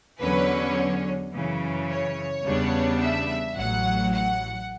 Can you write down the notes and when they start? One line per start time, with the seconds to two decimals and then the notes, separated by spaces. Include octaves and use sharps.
0.20 E2 D3 F#3 C#4 B4
1.32 F#2 C#3 E3
1.88 C#5
2.44 E2 C#3 G3 B3 D4
2.99 E5
3.55 A1 A2 F#3 F#5
4.10 F#5